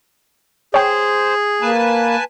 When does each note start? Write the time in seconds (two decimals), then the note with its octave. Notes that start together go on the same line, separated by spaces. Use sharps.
0.74 G#4 C5 C#5 G5
1.62 A#3 B4 G#5 A5